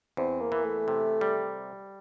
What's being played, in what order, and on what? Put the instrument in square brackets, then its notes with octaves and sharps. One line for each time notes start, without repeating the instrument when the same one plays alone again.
[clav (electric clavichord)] E2 [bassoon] C4
[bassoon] A#3
[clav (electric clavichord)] E3
[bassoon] A3
[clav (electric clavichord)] C3
G3